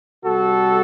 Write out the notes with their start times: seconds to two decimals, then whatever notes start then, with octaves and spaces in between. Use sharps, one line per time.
0.25 C3 G3 F#4 A4